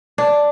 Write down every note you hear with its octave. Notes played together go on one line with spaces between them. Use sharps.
D4